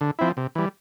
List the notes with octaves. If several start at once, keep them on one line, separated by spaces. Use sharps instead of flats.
D3
F3 C4 E4
C3
E3 G3